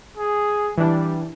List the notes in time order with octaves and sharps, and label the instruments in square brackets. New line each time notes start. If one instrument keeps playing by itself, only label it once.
[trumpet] G#4
[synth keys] E3 D4 [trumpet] G3